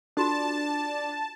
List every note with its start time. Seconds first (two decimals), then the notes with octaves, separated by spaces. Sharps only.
0.17 D4 F4 F#4 A4 A5